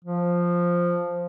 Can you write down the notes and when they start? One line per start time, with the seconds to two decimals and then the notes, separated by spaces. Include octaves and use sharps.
0.05 F3